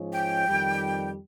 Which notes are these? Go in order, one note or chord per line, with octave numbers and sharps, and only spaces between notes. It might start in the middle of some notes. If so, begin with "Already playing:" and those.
Already playing: G#2 F3 G#3 C#4
G5
F2 D#3 G3